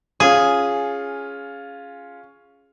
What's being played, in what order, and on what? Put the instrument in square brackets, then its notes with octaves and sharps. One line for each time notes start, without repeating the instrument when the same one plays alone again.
[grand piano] C#4 F4 [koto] G#4